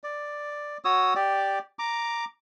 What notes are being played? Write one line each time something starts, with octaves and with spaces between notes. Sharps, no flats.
D5
F#4 C#5 D#6 E6
G4 D5
A#5 D6